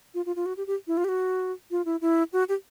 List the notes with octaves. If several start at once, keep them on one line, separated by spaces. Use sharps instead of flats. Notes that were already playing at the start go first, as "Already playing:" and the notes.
F4
F4
F4
F#4
G4
G4
E4
F4
G4
F#4
F4
E4
E4
F#4
G4